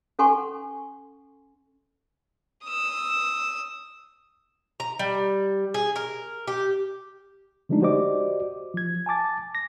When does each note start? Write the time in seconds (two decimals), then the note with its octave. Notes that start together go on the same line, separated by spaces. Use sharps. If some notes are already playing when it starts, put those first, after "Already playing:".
0.19 C#4 A4 F#5 G#5 C6 C#6
2.65 D#6 E6
4.80 A#5
4.99 G3
5.74 G#4
5.96 A#4
6.47 G4
7.69 D3 F3 G#3 A3 D4 D#4
7.82 F#4 G4 C5 D5 D#5 D6
8.74 F3 G#6
9.06 G#5 A5 D6 A6
9.55 A#6